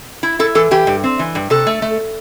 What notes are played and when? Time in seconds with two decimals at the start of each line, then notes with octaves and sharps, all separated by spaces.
0.23 E4
0.39 E4 A4
0.55 E3 A4
0.71 E3 G4
0.87 G2
1.03 C4
1.19 E3
1.35 G2
1.50 C3 A4
1.67 A3
1.82 A3